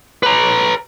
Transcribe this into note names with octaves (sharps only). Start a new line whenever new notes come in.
B4 A#5